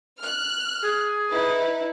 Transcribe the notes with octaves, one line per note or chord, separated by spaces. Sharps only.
F6 F#6
G#4
D#4 E4 B4